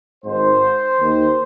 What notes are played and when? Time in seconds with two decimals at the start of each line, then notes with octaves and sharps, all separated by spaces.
0.25 G#1 G#2 D#3 C5
0.99 D#2 D#3